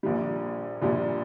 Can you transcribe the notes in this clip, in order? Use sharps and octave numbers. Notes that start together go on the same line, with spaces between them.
A#1 A#2 G3
A#1 A#2 G3